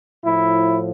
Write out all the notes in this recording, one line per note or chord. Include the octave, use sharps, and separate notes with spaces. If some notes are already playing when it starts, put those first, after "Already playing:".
A2 F3 E4